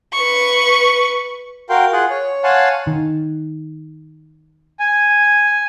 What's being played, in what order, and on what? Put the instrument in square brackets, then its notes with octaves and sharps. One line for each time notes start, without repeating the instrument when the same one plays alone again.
[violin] B4 C#6
[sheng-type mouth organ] F#4 A#4 F5 G5 C6
F4 G#4 F#5
C#5
C#5 F5 F#5 G#5 A5 C6
[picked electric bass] D#3
[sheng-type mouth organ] G#5